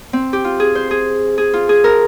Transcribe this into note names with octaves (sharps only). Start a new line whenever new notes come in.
C4
G4
F4
G#4
C5
G#4
G#4
F4
G#4
A#4